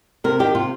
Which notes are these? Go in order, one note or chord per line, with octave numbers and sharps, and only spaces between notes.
C3 A#4
D#3 G4
C3 F4